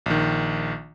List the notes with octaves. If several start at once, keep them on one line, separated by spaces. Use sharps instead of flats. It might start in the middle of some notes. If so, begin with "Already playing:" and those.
A#1 D#3